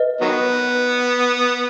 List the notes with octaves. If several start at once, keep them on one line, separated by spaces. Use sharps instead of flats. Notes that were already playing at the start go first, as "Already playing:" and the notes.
Already playing: B4 D#5
D#3 F#3 B3